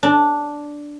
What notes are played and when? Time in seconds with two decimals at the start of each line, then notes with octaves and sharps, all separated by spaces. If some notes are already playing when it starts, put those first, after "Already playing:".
0.03 D4